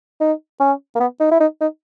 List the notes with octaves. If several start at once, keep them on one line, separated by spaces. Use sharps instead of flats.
D#4
C#4
A#3
B3
D#4
E4
D#4
D#4